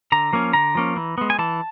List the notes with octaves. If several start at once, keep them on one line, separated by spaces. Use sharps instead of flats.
D3 A#5
F3 A#3 C#4
D3 A#5
F3 A#3 C#4
E3
G#3 B3
G#5
E3 A5